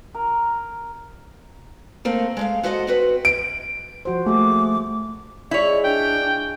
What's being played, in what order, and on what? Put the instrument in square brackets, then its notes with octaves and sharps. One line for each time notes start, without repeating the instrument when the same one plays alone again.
[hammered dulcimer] A#4
[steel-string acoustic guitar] A3 A#3 C4
G#3 A3 F5
F#4 A4 C5 D#5 F5 F#5
C4 F#4 B4
[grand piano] D7
[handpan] F3 F#4 C5
[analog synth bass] A3 [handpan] A#3 F#4 G#4 [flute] D6
[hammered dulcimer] G#3 F4 G#4 [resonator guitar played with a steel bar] E4 C#5 [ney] D5
[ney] D4 [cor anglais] G5